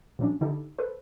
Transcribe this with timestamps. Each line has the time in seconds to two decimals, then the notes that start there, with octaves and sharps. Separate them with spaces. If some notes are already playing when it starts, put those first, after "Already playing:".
0.19 A#2 F3 F#3 C#4 D4
0.41 D3 D#4 E4 G4 A4
0.78 A4 B4 C5